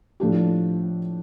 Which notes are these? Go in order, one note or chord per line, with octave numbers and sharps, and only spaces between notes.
A2 F3 A3 D4 G4